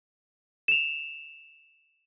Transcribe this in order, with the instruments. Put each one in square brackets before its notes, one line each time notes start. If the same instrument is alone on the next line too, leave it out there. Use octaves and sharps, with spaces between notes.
[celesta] E7 F7